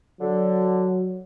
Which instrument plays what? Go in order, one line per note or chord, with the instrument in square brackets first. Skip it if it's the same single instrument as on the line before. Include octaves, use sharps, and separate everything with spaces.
[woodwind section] D3 [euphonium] F#3